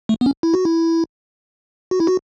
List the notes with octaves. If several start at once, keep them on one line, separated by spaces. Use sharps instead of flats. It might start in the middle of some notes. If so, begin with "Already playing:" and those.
A3
B3
C#4
E4
F#4
E4
F#4
E4
F#4